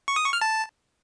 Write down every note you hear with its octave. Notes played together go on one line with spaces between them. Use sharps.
C#6
D#6
C#6
F6
A5